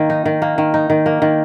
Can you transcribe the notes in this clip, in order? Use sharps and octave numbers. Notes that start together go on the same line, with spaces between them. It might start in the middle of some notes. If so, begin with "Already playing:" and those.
Already playing: D#3 A#3
D#4
D#3
A#3
D#3
D#4
D#3
A#3
D#3